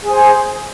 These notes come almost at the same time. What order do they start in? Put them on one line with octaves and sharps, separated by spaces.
G#4 G#5 C5